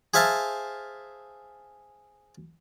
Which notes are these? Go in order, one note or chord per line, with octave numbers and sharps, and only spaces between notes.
G#4 C5 E5 F5 A5